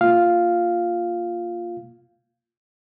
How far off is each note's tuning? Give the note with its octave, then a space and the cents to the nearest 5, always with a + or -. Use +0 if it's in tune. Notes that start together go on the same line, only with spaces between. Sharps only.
A#3 +0 F4 +0 F5 +0